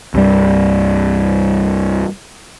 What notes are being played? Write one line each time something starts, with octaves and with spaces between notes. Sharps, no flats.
C2 G2 G3